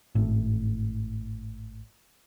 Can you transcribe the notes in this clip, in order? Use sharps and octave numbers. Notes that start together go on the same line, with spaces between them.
G#1 A2